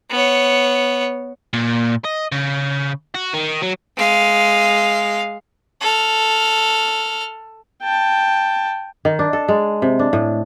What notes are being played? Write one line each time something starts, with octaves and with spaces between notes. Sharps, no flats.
B3 C#5
A#2
D#5
C#3
F#4
D#3
F#3
G#3 F5
A4 F6
G5 A5
D#3
D4
A4
G#3
C3
D4
A2